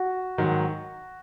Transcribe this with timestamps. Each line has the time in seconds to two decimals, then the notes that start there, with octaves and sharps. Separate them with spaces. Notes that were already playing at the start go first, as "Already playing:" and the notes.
Already playing: F#4
0.38 G#2 D#3 F#3